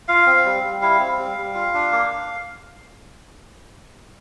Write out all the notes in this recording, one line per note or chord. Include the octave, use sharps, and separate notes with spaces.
F4 F5
C4
G3
G3
E4 F5
C4
G3
G3
F4
D4
A#3